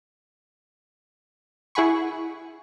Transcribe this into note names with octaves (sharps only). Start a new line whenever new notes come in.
E4 G#4 F#5 G#5 B5 C#6